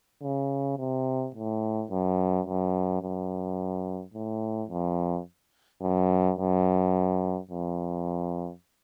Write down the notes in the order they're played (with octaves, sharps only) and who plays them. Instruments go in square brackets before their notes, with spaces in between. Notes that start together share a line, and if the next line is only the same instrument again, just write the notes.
[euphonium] C#3
C3
A2
F#2
F#2
F#2
A2
F2
F#2
F#2
F2